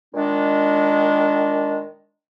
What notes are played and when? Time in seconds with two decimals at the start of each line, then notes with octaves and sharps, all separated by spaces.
0.14 A#2 D#3 G#3 D4